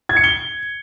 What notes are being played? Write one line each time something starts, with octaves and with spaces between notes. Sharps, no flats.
G#6
C#7
G7